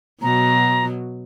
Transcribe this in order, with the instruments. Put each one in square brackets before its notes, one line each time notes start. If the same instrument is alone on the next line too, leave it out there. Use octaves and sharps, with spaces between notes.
[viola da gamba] B2 F#3 [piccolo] A#5